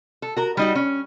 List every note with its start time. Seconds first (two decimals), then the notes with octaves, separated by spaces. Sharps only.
0.22 A4
0.36 F#4 A#4
0.57 G3 D#4 F#4
0.75 C#4